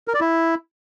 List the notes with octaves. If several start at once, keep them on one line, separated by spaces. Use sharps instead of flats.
A#4
D5
E4